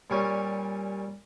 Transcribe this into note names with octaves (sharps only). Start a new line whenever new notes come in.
A#2 G3 C#4 G#5